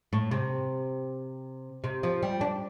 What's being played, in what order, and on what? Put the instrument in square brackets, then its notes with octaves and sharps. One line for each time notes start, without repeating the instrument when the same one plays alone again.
[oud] A2
C3
C3
F3
G3
D4